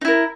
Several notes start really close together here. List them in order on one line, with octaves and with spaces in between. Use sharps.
D#4 E4 A#4